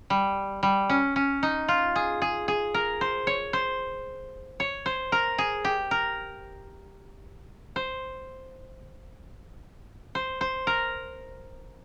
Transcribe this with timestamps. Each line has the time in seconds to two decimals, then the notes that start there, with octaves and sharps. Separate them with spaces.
0.10 G3
0.63 G3
0.89 C#4
1.16 C#4
1.43 D#4
1.68 F4
1.96 G#4
2.22 G#4
2.48 G#4
2.74 A#4
3.01 C5
3.27 C#5
3.53 C5
4.60 C#5
4.86 C5
5.12 A#4
5.38 G#4
5.65 G4
5.91 A#4
7.76 C5
10.15 C5
10.41 C5
10.67 A#4